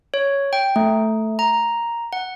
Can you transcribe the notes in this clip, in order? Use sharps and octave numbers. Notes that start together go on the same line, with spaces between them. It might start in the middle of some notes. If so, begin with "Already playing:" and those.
C#5
G5
A3
A#5
F#5